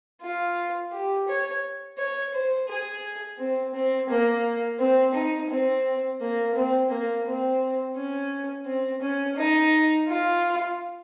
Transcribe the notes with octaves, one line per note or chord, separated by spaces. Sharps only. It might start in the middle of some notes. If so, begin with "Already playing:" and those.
F4
G4
C#5
C#5
C5
G#4
C4
C4
A#3
C4
D#4
C4
A#3
C4
A#3
C4
C#4
C4
C#4
D#4
F4